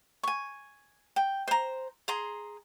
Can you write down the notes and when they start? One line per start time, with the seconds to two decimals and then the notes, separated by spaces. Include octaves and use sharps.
0.23 G#5 C#6
1.16 G5
1.48 C5 A#5
2.08 G#4 A#5 C6